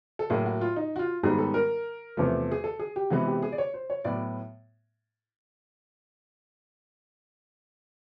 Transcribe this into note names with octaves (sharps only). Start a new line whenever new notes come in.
A4
A2 F#3 A#3 G#4
F#4
F4
D#4
F#4
F4
G#2 D#3 G3 B3 G#4
A4
A#4
E2 C3 F3 A3
G#4
A4
G#4
G4
C3 E3 G#3 B3 F#4
G4
G#4
D5
C#5
C5
C#5
A2 F#3 B3 D5